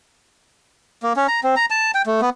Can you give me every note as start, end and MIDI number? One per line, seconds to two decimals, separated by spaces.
1.03 1.13 58
1.16 1.27 61
1.28 1.40 82
1.44 1.55 60
1.56 1.66 82
1.70 1.91 81
1.94 2.02 79
2.06 2.21 57
2.21 2.30 59